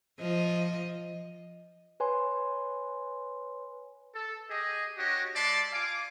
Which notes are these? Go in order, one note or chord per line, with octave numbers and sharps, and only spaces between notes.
F3 D#5
B4 C#5 G#5 C6
A4
G4 G#4 D#5
D4 F#4 G4 C#5 D#5
G#3 D5 E5 A5 C6
F4 F5 G#5 D6